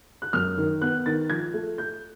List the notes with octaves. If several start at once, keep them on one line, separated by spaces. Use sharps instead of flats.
F#6
F#2 F6
D#3
B3 F#6
D#3 A6
F3 G#6
A3
A3 G6